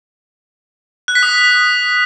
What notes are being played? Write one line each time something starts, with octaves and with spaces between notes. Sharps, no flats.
F#6
B6
D#6